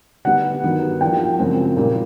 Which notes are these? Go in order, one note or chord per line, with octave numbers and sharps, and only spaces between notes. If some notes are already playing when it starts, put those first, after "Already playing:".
D3 G3 B3 D#4 G4 F#5
G2 D#3 F#3 B3 D#4
F3 A#3 D4 G4 G5
F#2 C#3 F3 G#3 C4
A#2 G3 A#3 D#4 G4